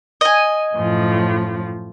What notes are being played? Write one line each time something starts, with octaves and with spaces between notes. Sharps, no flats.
D#5 G#5
F#2 A2 F3